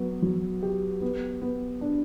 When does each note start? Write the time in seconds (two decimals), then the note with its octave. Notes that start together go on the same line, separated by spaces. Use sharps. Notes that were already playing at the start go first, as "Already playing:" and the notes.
Already playing: F#3 B3
0.22 F#3
0.62 G4
1.01 B3
1.41 B3
1.81 D4